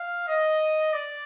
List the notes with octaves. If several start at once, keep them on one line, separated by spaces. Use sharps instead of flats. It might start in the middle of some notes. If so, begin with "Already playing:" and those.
Already playing: F5
D#5
D5